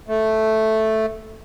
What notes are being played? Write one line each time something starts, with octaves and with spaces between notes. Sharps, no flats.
A3